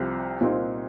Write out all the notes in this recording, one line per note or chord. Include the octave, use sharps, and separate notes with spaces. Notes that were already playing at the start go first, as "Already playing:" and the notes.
Already playing: C2 C3 F3
C2 A#2 G3 C4 D#4